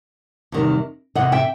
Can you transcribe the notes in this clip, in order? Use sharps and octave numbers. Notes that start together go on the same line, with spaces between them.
E2 C3 D#3 G3
E2 C3 D#5 F#5
E5 G5